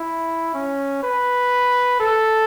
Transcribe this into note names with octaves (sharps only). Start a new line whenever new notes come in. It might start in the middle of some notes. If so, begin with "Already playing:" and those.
Already playing: E4
C#4
B4
A4